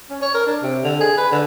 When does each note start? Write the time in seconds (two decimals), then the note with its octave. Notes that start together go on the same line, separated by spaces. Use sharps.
0.10 C#4
0.22 C#5
0.34 A#4
0.47 D4
0.63 C3
0.84 D3
1.00 G#4
1.18 B4
1.31 D3